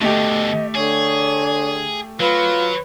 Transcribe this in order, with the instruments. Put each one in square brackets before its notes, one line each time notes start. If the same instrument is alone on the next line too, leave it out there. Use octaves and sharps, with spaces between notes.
[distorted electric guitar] B2 D3 [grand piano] A3 G4 [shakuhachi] D#5
[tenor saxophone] D3 [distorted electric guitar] G#4 [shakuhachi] C#5
[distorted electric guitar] F#3 [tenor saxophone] F4 [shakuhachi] B4